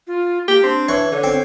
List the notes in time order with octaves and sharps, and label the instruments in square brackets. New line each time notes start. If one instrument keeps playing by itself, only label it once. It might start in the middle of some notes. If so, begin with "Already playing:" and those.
[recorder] F4
[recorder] A#3 [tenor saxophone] G4
[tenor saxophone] C4 [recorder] D4
[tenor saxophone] E3 [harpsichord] C#5
[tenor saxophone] D3 [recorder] C#5
[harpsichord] C4